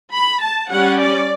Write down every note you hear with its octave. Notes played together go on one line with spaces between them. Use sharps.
B5
A5
G3 C#4 F#5
D5